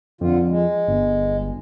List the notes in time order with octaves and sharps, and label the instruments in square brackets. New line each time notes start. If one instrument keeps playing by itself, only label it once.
[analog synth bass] F2 [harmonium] D3 F4
[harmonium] G#3
[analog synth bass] G1